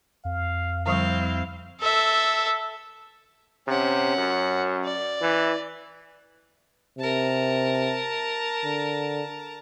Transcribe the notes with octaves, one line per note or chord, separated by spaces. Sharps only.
F2 F5
D3 F3 G3 C4 E4 F5
A4 E5
C3 C#4 F#5
F#2
D5
E3
C3 A#4 A5
D3